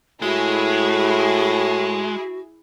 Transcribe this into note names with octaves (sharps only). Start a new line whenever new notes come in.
A2 G#3 E4 F#4 G#4